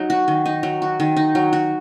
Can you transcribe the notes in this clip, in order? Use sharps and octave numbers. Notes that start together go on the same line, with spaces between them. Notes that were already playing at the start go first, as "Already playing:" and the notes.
Already playing: F#3 D#4
F#4
D#3
D#4
F#3
F#4
D#3
D#4
F#3
F#4